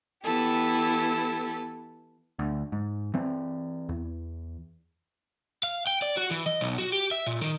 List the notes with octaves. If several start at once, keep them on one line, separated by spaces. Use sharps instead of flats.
E3 B3 E4 G4 A4
D2
G#2
E3 C4
E2
F5
G5
D5
F#4
E3
D#5
B1
F#4
G4
E5
A#2
D#3